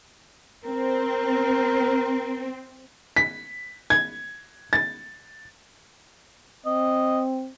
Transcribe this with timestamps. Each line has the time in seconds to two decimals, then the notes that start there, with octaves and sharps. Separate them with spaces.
0.65 C4 A#4
3.16 B6
3.90 G#6
4.73 A6
6.66 C4 D#5